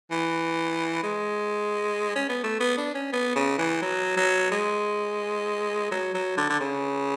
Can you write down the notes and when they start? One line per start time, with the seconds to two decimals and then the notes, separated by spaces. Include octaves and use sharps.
0.11 E3
1.03 G#3
2.16 C#4
2.29 B3
2.43 A3
2.60 B3
2.77 D4
2.94 C#4
3.12 B3
3.36 C#3
3.58 E3
3.82 F#3
4.17 F#3
4.51 G#3
5.91 F#3
6.14 F#3
6.37 D3
6.50 D3
6.60 C#3